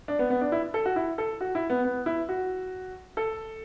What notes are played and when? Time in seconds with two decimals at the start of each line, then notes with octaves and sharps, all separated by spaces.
0.08 D4
0.19 B3
0.30 B3
0.41 D4
0.52 E4
0.74 A4
0.85 F#4
0.96 E4
1.18 A4
1.41 F#4
1.55 E4
1.70 B3
1.84 B3
2.06 E4
2.29 F#4
3.17 A4